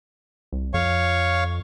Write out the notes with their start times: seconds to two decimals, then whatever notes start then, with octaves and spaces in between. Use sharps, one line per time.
0.52 C2
0.74 F2 C#5 F5 C#6